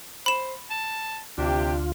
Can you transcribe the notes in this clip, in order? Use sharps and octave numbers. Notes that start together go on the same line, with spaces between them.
C5 B5 E7
A5
D2 C3 D4 F4 G4